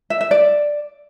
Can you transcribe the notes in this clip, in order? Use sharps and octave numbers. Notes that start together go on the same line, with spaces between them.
E5
E5
D5